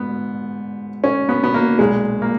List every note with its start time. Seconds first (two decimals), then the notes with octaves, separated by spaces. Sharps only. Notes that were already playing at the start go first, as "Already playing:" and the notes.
Already playing: G#2 B3
1.04 C#4
1.29 B3
1.44 B3
1.54 A#3
1.79 B1 A#2 G#3
2.22 A#3